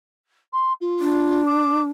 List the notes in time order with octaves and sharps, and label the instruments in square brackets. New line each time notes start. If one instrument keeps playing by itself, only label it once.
[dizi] C6
F4
[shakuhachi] D4
[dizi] D6